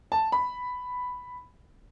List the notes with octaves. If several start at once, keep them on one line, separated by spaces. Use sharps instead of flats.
A5
B5